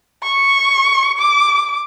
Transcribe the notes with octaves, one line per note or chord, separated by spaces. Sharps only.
C#6
D6